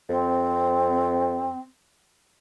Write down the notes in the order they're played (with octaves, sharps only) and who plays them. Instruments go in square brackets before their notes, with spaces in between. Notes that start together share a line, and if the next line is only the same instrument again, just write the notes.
[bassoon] F2 [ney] C4